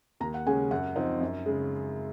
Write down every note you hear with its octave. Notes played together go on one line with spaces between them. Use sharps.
D#2 A#5
F#5
C#3 G#3 C#4 G#5
F#2 F#5
F3 C4 D#4
F#2
C#3 G#3